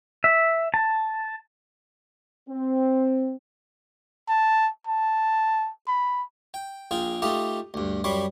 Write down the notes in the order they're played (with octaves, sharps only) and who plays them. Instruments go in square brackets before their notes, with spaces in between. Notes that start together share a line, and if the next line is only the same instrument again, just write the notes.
[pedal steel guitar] E5
A5
[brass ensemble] C4
[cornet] A5
A5
B5
[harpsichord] G5
A#1 F4 G#4 G5
A3 D#4 F4 G4 D#5 A5
D2 G2
F#2 G3 C#5 B5 C6 D6